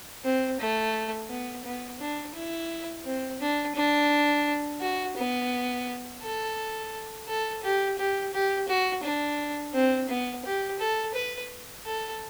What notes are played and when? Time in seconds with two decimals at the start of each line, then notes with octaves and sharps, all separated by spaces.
0.24 C4
0.60 A3
1.30 B3
1.65 B3
2.00 D4
2.35 E4
3.05 C4
3.40 D4
3.75 D4
4.81 F#4
5.16 B3
6.21 A4
7.27 A4
7.63 G4
7.98 G4
8.33 G4
8.68 F#4
9.03 D4
9.73 C4
10.09 B3
10.45 G4
10.79 A4
11.14 B4
11.86 A4